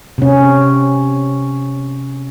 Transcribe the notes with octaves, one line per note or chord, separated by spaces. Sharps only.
C3 C#4